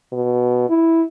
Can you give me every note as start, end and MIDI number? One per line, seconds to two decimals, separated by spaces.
0.13 0.68 47
0.69 1.03 64